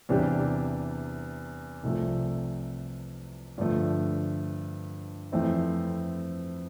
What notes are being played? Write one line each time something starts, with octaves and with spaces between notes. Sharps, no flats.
E2 C3 G3 D4 G4
C2 C3 F3 A3
G2 D3 F3 A3
F2 E3 A3 C4 E4